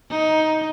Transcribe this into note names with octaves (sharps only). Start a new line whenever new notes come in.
D#4